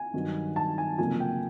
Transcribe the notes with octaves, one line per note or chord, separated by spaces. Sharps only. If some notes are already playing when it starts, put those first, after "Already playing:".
Already playing: G#5
G2 D#3 F#3
A5
G#5
F1 F2 C#3 F#3 A#3 G#5
G5